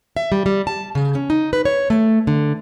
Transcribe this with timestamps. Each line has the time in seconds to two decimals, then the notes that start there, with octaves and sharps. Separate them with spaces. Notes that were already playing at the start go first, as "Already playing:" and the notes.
0.17 E5
0.32 G3
0.46 G3
0.67 A5
0.95 C#3
1.15 C#4
1.30 D#4
1.53 B4
1.65 C#5
1.90 A3
2.27 D3